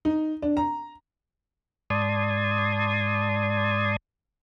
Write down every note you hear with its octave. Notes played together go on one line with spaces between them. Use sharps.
D#4
D4
A#5
G#2 D5 A5 C6 D#6 G#6